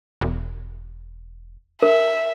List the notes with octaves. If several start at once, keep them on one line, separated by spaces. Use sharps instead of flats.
E1
A#4 E5